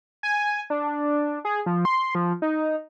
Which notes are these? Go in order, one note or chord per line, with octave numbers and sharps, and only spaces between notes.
G#5
D4
G#4
F3
C6
F3
D#4